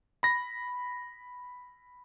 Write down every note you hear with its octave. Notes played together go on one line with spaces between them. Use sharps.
B5 A#6